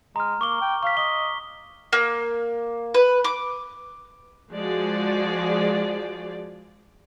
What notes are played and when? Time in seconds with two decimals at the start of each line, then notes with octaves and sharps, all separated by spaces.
0.16 G#3 A#5 F6
0.41 A#3 C#6 D6 G7
0.61 G5
0.83 F5 C#6 B6
0.97 D#5 G7
1.93 A#3
2.94 B4
3.24 D6
4.51 F3 G#3 F#4 G#4 D5